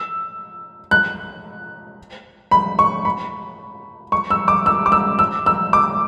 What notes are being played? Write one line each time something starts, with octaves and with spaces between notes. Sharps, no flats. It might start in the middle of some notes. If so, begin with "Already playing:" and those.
Already playing: E6
F#6
B5
C#6
B5
C#6
E6
D6
E6
D6
E6
E6
E6
D6